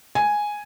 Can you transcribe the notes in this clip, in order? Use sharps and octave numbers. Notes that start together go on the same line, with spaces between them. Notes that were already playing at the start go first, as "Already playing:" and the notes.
G#5